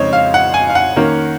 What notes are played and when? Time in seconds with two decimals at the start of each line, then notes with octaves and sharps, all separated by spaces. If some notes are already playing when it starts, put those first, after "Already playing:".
Already playing: F2 C#3 G#3 C4 D#4 C5 C#5
0.13 F5
0.34 F#5
0.54 G#5
0.70 F5
0.75 F#5
0.96 D#3 A#3 C#4